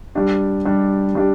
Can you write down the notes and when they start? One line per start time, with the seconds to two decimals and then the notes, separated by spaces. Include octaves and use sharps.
0.15 G3 D4 G4
0.65 G3 D4 G4
1.15 G3 D4 G4